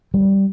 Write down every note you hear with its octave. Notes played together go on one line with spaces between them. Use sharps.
G3